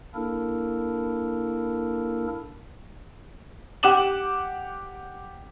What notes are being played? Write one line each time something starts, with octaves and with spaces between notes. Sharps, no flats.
A#3 D4 E4 A4 A#4
G4 F#5 G5 D6 E7 F#7